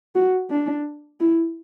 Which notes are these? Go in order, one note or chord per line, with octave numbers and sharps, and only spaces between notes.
F#4
D4
E4